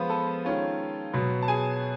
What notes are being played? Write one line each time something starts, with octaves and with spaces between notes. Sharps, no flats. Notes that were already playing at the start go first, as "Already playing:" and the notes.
Already playing: F3 G#3 B3 B4 C5 B5
A4 A5
D#3 G#3 C#4 F4
B2 F#3 B3
A5
G#4 G#5